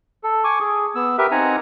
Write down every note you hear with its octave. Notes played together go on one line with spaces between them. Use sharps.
A4
G#5 C#6 D6
G#4
B3 E6
G4 A#4 B4 E5
C4 D#4 F#5 G#5 A#5